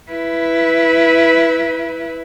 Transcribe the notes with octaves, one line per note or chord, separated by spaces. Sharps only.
E4 B4